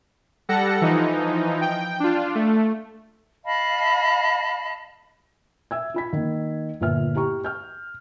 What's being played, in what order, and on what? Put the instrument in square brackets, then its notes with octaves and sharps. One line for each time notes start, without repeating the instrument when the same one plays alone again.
[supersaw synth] G3 A4 F#5 A#6 C#7
E3 F3 D#4
G5
D4 F4
A3
[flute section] D#5 F5 A5 B5
[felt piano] E5 E6 G#6
F4 B5 B6
D#3 A#3
G1 A#2 B4 E5 F6
E4 G4 A#5 C#6
F6 G6